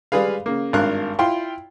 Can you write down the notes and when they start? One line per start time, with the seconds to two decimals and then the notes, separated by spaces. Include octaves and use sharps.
0.12 G3 G#3 G#4 B4 F5
0.46 C#3 A#3
0.73 G#1 G2 A#4 F5 F#6
1.19 E4 F4 G5 C6